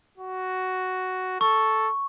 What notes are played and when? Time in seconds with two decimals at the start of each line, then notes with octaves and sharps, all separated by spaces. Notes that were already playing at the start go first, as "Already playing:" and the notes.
0.18 F#4
1.41 A4 C#6